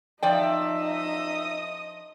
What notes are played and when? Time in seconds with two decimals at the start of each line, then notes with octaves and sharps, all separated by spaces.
0.23 F3 D#4 D5 E5 G5
0.83 D#5 D#6